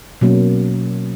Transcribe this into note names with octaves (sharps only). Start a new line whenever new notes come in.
B2 F#3 A#3 C#4